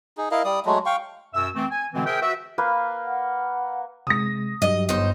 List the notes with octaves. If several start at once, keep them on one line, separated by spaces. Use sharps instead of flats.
D#4 G#4
E4 A#4 D#5 F5
G3 D5 D#6
F#3 G#3 A3
F5 G5 C#6
F#2 B2 E5 E6
E3 A3 C4
G#5
B2 D3 E3 G#3 A3 C4
G#4 A#4 C5 E5 G5
F#4 B4 E5
A#3 B4 F5
F#5
C3 G#3 D#6 A#6
G2 F#3 G4 D#5
G1 D#4 C5